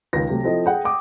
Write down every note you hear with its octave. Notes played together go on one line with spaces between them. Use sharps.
C#2 D#3 F5 A#6
C3 F#3 A3
F3 C4 E4 A4 D#5
G#4 F#5 G5
F#5 G5 D6 D#6